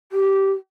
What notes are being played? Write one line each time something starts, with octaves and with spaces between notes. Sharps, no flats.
G4